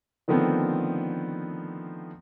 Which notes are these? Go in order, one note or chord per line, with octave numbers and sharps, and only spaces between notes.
D3 D#3 F3 A3 B3 C4